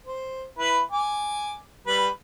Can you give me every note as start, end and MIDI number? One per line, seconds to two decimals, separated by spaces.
0.06 0.44 72
0.59 0.80 64
0.59 0.80 71
0.92 1.57 80
0.92 1.57 86
1.87 2.08 55
1.87 2.08 71